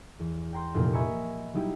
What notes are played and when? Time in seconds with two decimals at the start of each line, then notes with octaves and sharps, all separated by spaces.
0.20 E2
0.53 G5 A#5 C6 G6
0.74 F1 C2 A#2 F4 G4
0.93 D#5 E5 G#5 A#5 B5 C#6
1.54 F#3 G3 D#4 E4 G4